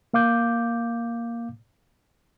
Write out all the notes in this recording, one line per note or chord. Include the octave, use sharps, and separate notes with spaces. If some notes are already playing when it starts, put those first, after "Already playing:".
A#3 F5 D6 G6